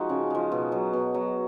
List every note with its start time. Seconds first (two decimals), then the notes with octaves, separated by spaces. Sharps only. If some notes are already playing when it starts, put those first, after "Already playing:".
Already playing: F3 G#3 D#4 F#4
0.09 C#3
0.30 F3 G#3
0.52 B2
0.72 F#3
0.93 B2
1.14 F#3